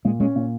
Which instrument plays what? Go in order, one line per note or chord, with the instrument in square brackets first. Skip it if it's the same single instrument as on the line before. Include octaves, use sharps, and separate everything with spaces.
[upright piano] A#2 [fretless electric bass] G#3
[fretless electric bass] G#3 [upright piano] C#4
[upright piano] A#2